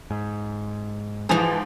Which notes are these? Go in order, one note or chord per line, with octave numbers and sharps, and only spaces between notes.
G#2
G#2 E3 F3 G#4 F7